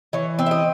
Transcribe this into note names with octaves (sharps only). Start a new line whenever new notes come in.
E3 C#5
C4
E5
D#5